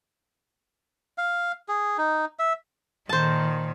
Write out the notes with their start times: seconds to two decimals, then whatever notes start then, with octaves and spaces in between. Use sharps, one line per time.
1.18 F5
1.68 G#4
1.98 D#4
2.39 E5
3.09 A#2 D#3 C5 A5